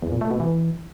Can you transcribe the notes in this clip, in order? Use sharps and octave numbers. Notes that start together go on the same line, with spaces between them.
E2
A#2
A3
B2
E3